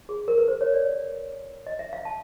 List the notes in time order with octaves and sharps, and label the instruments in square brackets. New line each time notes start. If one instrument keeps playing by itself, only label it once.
[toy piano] G#4
A#4
B4
C5
C#5
D5
D#5
E5
F5
A5